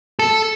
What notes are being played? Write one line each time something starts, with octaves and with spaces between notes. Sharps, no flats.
A4